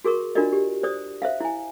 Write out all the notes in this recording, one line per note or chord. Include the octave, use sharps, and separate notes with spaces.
F#4 G#4 A#4 C#6
D4 F4 F#4 A#4 D5 D#5
G4
C5 D5 D#6
C5 E5 F5
E4 G#5